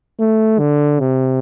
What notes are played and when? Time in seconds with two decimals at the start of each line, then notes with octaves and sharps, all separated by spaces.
0.19 A3
0.59 D3
0.99 C3